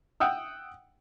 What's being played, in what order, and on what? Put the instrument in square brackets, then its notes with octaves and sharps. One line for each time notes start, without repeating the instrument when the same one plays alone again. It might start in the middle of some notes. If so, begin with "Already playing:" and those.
[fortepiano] F#5 G5 D#6 E6